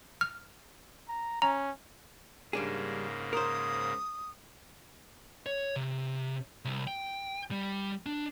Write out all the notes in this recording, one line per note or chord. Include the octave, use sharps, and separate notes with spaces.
F6
A#5
C#4 A#5
G#2 C#3 G3 A#3 D4 G#4
A#4 C5 D#6
C#5
C3
C2
G5
G3
D4